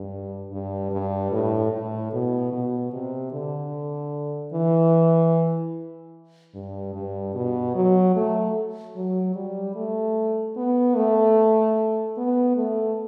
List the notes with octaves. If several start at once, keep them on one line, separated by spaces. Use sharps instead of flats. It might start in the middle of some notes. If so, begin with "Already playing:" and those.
Already playing: G2
G2
G2
A2
A2
B2
B2
C3
D3
E3
G2
G2
B2
F#3
A3
F#3
G3
A3
B3
A3
B3
A3